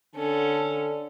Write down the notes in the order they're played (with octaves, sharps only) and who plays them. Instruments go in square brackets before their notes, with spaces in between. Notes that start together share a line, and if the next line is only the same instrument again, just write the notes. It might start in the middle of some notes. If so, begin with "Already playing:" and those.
[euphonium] D3 [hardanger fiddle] C#4 A4